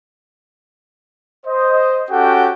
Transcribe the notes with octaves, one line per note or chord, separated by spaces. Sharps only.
C5 D#5
C#4 F#4 G4 A4 F#5 G5